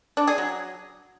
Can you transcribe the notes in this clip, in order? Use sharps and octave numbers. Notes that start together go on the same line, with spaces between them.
D4
G#4
F#3